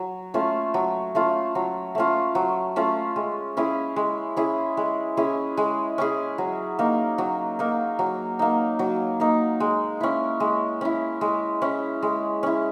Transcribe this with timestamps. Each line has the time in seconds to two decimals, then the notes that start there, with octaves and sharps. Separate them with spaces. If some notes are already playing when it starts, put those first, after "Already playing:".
Already playing: F#3
0.34 A3 C#4 F4
0.74 F#3
1.15 A3 C#4 F4
1.55 F#3
1.95 A3 C#4 F4
2.35 F#3
2.76 A3 C#4 F4
3.16 G#3
3.57 C#4 E4 G#4
3.96 G#3
4.37 C#4 E4 G#4
4.77 G#3
5.17 C#4 E4 G#4
5.57 G#3
5.98 C#4 E4 G#4
6.38 F#3
6.79 A#3 D#4
7.18 F#3
7.59 A#3 D#4
7.99 F#3
8.39 A#3 D#4
8.79 F#3
9.20 A#3 D#4
9.60 G#3
10.00 C#4 E4
10.40 G#3
10.81 C#4 E4
11.21 G#3
11.62 C#4 E4
12.02 G#3
12.43 C#4 E4